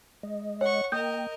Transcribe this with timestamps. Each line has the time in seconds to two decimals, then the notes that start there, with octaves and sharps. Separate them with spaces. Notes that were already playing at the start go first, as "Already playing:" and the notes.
0.23 G#3 D#5
0.61 C#5 F#5 C#6
0.92 A#3 A#4 D#5 G5 D#6 G6